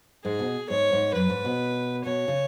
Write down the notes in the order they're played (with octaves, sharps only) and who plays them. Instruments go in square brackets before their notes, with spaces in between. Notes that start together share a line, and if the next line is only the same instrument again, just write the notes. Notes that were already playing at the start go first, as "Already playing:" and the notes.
[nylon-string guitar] G#2 [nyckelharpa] G#4
[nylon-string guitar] B2
[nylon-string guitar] G#2 [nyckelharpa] C#5
[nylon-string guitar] G#2
[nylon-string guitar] F#2 [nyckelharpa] B4
[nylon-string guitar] G#2
B2
[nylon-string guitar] B2 [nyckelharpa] C#5
[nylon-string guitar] C#3